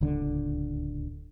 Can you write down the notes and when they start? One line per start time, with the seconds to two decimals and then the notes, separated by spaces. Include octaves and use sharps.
0.01 D1 C#2 D3